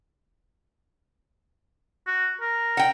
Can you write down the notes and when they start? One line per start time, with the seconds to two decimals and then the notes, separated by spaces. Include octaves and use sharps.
2.07 F#4
2.41 A#4
2.77 F#5 G5